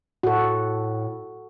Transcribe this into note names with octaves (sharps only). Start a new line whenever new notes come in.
A2 F#4 A4